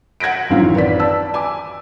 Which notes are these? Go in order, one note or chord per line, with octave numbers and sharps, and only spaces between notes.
F#5 G#6 A#6 B6 D7
A1 F#2 D#3 C4 F4 F5
B4 D5 B6
D5 A5 E6
G#5 D6